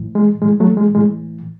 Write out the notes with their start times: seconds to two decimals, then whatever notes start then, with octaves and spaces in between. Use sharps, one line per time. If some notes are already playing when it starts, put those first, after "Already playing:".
Already playing: A2 E3
0.15 G#3
0.42 A2 E3 G#3
0.60 F#3 A3
0.77 G#3
0.95 A2 E3 G#3